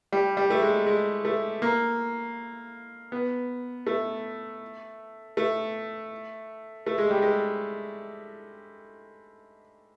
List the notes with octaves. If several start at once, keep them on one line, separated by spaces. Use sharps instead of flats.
G3
G3
A3
G#3
G#3
A3
A#3
B3
A3
A3
A3
G#3
G3
G#3